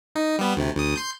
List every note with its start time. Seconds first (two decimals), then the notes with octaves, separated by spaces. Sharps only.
0.16 D#4
0.39 G3 B3
0.57 D2 C3
0.76 D2 D#6
0.96 C6 G6